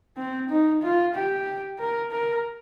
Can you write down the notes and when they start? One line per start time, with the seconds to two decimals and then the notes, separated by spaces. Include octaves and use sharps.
0.17 C4
0.49 D#4
0.82 F4
1.14 G4
1.79 A#4
2.11 A#4